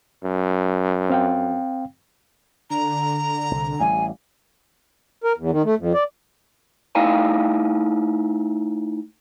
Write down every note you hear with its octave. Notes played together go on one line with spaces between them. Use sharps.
F#2
C4 F5 G5
D3 A#5
C2
A1 G3 G#5
A#4
E2
D#3
A3
F2
D5
A3 D#4 E4 F5 G5 G#5